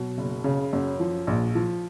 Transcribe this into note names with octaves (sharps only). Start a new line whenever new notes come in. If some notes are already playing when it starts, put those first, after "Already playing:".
Already playing: B2 F#3
F#1
C#3
F#2
F3
A#1
F3